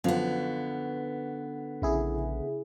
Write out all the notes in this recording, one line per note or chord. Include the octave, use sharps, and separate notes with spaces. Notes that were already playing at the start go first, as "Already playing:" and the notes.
F#2 D3 F3 B3 F5
A#1 C#3 E4 G#4